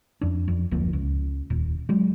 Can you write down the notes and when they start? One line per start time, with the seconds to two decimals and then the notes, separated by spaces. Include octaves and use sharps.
0.21 F2 D4
0.48 F2
0.71 F#1 D2 F3 A#3
0.93 C#2
1.50 D#1 A#2
1.89 F#3 G#3